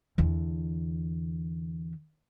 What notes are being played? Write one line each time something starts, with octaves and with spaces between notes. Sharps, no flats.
E2 D3